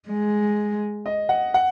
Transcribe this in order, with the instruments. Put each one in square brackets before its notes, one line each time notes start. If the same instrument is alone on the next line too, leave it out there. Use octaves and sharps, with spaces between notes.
[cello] G#3
[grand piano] D#5
F#5
F#5